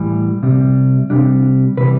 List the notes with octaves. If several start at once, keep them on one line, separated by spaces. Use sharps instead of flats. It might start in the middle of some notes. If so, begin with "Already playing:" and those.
Already playing: A2 E3 G3
C3 G3
C3 G3 D4
C3 E3 G3 B4